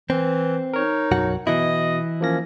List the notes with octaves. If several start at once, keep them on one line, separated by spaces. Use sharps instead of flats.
E3 C4
D#4 A#4 C#5
B1 F#2 F#4
B2 E3 E4 D#5
F3 A#3 C#4 A#6